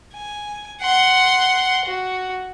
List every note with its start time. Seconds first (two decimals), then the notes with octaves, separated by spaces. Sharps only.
0.15 G#5
0.82 F#5 C6
1.86 F#4